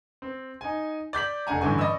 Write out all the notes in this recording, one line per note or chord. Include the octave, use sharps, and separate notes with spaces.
C4
D#4 G#5
D5 G6 B6 F#7
F1 D4 F#5 G#5 A#5
A1 G2 D3 E3 G#5 C#6
D5 D#5 B5 C#6 E6